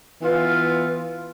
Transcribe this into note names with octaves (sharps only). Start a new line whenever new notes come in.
E3 B3 F4